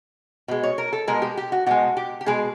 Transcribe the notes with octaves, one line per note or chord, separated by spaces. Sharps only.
B2 G#3
C#5
A#4
A4
B2 G#3 A#4
G4
G4
F#4
B2 G#3 F#4
G4
G4
B2 G#3 G#4